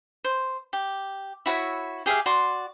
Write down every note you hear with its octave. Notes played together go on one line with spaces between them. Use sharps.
C5
G4
E4 F#4 C#5 E5
G4 G#4 E5 F5
F#4 D5 C6